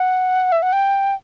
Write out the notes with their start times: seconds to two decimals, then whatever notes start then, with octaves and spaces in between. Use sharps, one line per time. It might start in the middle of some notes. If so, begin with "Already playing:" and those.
Already playing: F#5
0.52 E5
0.62 F#5
0.73 G5